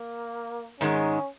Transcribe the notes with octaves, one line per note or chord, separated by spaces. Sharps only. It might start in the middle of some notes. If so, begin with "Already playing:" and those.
Already playing: A#3
G#2 D#3 G#3 C#4